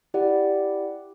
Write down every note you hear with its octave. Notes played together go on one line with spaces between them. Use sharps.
E4 G4 D5 F#5